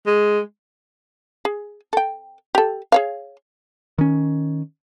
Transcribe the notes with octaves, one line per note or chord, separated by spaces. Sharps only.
G#3
G#4
A4 G5
G4 A4
G#4 C#5 F5
D#3 C#4